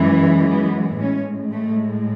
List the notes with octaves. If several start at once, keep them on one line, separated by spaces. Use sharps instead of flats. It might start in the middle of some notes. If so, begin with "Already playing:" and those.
Already playing: F#2 E3 G#3
B3
A2 G#3 C#4
A3